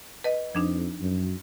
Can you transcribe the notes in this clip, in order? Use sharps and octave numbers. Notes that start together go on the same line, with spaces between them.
B4 D#5
F2 F3 D4 D#4
F#2